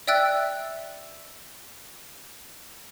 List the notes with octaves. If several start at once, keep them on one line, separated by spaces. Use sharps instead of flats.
D5 E5 G5 E6 F#6 A6